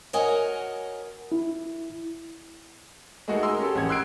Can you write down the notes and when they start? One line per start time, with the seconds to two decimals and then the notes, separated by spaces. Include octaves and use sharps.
0.13 F#4 A#4 C#5 D#5 F#5 G#5
1.32 E4
3.28 G#3 A3 D#4 F#4 G#4 A#4
3.43 G#4 A#4 D#5 C6 E6
3.59 C#4 G4 A4
3.75 A1 G4 F#5 G#6
3.89 C6 E6 F#6 G#6 C7 D7